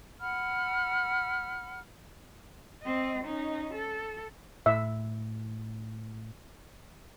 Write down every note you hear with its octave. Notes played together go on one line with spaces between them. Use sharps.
F#5 B5 F6
C4 D#5
C#4 D#4
A4
A2 E5